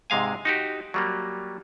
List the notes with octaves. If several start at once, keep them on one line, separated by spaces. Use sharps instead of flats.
G#2 C3 G#3 F5 G#5
D#4 F#4 G4
F#3 G3 A#3